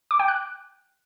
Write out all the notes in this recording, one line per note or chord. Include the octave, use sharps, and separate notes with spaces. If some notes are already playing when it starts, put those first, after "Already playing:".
D6
G5
F#6